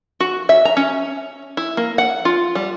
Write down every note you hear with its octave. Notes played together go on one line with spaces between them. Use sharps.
F#4
E5
A#5
C#4
E4
A#3
F#5
F4
G3